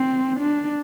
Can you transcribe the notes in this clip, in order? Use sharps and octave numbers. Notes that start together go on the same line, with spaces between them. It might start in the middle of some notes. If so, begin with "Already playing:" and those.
Already playing: C4
D4